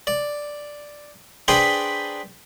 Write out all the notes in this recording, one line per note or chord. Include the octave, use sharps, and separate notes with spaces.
D5
D4 G#4 B4 C5 G5 B5